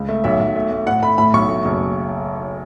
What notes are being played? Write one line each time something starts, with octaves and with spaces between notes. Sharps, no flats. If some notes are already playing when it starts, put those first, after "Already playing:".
Already playing: C#2
A3
B1 E5
B1
A3
A3
A2 F#5
A3 B5
A2 B5
B1 C#6
A3
F#1